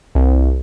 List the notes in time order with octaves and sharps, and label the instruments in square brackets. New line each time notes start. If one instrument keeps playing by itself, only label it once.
[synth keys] C2